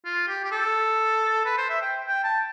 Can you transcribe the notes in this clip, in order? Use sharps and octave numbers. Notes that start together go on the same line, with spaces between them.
F4
G4
G4
A4
B4
C5
E5
G5
G5
A5